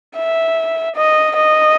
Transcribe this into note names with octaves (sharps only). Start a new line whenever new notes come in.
E5
D#5
D#5